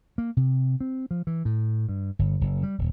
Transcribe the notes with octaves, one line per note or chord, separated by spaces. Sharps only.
A#3
C3
C4
F3
E3
A2
G2
G1
F#1
G3
D#1